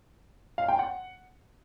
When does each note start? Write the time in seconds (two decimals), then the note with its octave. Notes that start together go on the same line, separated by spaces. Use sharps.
0.58 F5
0.68 G5
0.79 F#5